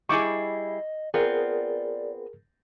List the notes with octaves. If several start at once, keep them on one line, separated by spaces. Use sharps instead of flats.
G3 E4 G#4 D#5 C#6 D6
B3 C4 F4 G#4 A#4 D5